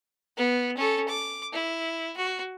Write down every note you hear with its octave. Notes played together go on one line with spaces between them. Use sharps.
B3
C#4 A4
D6
E4
F#4